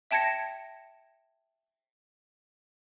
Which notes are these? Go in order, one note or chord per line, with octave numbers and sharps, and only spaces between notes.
E5 G5 A5 G#6 A#6 C#7